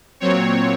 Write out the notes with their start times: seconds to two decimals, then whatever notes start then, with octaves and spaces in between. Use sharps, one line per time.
0.20 A#2 F#3 C4 C#5